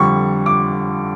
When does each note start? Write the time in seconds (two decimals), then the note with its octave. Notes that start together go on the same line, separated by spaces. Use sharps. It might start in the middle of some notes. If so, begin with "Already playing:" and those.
Already playing: F2 D3 G3 C#6
0.46 D6